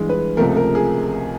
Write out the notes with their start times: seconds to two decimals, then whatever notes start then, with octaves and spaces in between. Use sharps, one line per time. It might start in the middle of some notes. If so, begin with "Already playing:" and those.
Already playing: G2 E3 G#3
0.09 B4
0.37 C#2 C3 F3 A3 A#4
0.57 A#4
0.75 G#4